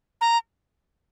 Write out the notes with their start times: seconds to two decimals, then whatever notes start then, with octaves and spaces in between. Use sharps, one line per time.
0.21 A#5